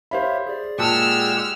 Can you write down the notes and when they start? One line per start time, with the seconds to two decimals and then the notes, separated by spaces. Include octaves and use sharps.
0.11 G4 C5 C#5 E5 F5 B5
0.47 G#4 D5
0.78 A#2 G#3 G4 F#5 A5 E6 F6